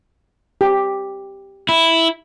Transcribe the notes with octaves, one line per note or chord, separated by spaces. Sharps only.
G4
E4